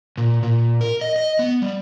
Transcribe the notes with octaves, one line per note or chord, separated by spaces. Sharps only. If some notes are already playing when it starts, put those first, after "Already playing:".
A#2
A#2
A#4
D#5
D#5
B3
G3